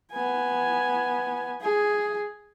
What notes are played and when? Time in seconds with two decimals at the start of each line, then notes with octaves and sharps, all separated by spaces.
0.12 B3 G#5
1.61 G#4